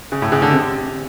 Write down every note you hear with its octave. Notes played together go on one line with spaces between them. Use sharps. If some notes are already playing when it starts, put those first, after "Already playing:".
C#3
A2
C#3
D3
C3